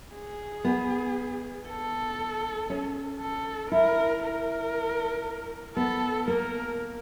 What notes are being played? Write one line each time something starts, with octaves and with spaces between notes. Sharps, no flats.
G#4
B3
A4
C#4
A4
E4 A#4
A#4
B3 A4
A#3 A#4